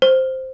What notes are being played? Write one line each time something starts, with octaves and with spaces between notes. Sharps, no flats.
C5